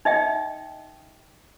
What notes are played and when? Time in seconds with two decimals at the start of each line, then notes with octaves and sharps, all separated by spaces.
0.05 D#4 D#5 E5 G5